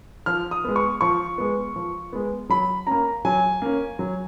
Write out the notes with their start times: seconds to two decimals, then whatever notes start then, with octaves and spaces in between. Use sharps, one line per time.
0.26 F3 F6
0.51 D#6
0.64 G#3 B3
0.76 C#6
1.01 F3 C#6
1.38 G#3 B3
1.76 F3
2.13 G#3 B3
2.50 F#3 B5
2.87 A#3 C#4 A#5
3.25 F#3 G#5
3.62 A#3 C#4
3.99 F#3